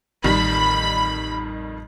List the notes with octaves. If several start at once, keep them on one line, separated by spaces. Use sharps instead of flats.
A1 F2 D#3 G3 B5